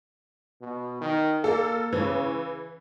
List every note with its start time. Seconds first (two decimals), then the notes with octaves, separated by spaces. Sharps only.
0.61 B2
1.01 D#3
1.44 A#3 A4
1.93 C#3 E3